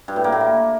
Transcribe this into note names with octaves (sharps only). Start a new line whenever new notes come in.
G2
A2
A#3
A2
A#3